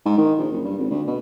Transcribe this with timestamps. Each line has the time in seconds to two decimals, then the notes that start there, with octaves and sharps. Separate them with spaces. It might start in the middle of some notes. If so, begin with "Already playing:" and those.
0.06 G#2
0.18 D#3
0.38 A#1
0.52 F#1
0.65 G2
0.78 G#1
0.91 D2
1.07 B2